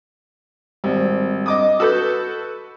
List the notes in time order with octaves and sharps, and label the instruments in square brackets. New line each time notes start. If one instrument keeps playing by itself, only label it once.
[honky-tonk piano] G#1 [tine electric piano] G3 C4
[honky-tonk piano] D#5 D6 D#6
[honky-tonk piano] F#4 A4 B4 [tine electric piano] E6 G6